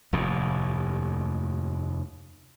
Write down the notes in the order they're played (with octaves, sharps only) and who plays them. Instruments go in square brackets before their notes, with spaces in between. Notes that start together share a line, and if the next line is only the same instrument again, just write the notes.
[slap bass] F1 D#2 A2